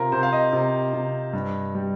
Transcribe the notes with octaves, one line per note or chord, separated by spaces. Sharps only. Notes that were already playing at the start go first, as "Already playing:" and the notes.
Already playing: C3 F4 A#4
C3 C5
F5
D#5
C3
C3
G2
G3